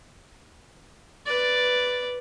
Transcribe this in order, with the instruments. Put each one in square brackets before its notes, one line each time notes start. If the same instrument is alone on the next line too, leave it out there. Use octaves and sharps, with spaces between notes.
[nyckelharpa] B4 D5